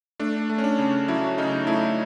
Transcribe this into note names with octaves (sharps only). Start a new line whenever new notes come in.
A3 D4
A3
C#4
D4
C#3
F#3 E4
C#3 D#4
A3 E4